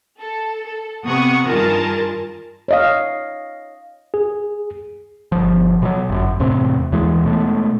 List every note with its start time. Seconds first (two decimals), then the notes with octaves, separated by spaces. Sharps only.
0.20 A4
0.64 A4
1.05 C3 B3 F#5 C#6 D#6
1.47 G2 D#3 F4 G#4 A#4 A5
2.68 C#5 D#5 F5
4.14 G#4
5.32 G1 F3
5.82 B2 F3 F#3
6.09 G1 F#2
6.40 E2 A2 C3 C4
6.92 D#2 E3 G#3
7.25 B2 G#3 A3